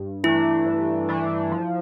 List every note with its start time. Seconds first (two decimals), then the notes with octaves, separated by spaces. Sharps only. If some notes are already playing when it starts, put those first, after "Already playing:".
Already playing: G2
0.24 E3 A3 D4 E4
0.65 G2
1.09 E3 A3 D4
1.52 F3